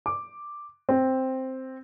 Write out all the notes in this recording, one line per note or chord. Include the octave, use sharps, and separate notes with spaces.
D6
C4